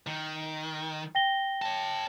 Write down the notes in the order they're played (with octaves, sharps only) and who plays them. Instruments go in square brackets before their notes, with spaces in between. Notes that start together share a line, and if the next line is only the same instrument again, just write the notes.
[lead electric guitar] D#3
[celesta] G5 A#6 G7
[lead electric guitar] C#5 A5